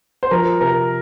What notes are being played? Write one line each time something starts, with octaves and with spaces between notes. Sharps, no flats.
C5
F3 A#4
C3 A#4